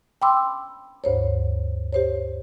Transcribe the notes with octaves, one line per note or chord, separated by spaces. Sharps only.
G5 B5 C6 D6 E6
D2 G2 C5 C#5
G4 C5 C#5